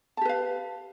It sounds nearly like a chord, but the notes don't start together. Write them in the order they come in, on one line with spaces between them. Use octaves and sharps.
A5 G4 B4 F5